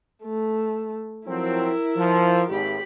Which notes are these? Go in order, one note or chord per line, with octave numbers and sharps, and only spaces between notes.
A3
F3 F#3 C4 E4 A#4
F3
G#1 G4 B5